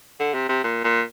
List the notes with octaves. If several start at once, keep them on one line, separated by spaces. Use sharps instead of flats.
D3
C3
C3
A#2
A#2